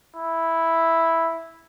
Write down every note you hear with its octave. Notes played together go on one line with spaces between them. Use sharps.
E4